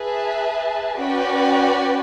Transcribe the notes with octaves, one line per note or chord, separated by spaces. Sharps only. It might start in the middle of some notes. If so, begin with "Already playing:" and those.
Already playing: G#4 B4 E5 A5
C#4 F#4 B4 D5 G5